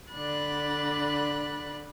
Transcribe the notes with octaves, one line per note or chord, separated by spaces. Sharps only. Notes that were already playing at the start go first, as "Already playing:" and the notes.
D3 D4 B5 F#6 A6